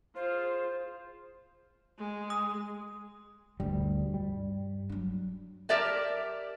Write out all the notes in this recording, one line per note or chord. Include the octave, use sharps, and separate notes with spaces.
F4 G#4 C5
G#3
D#6
D2 G2 G3
G3
F#3 D4
G4 A#4 D5 E5 A5